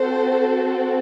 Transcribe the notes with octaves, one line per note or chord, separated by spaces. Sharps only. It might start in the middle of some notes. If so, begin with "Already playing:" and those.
Already playing: C4 F#4 A4 C5